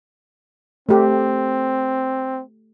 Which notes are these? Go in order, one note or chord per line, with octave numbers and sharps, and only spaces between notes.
A3 C4 G4